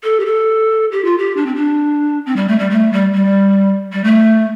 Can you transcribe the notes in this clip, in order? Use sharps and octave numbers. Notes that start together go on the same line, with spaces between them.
A4
G4
A4
G4
F4
G4
D4
C4
D4
C4
G3
A3
G3
A3
G3
G3
G3
A3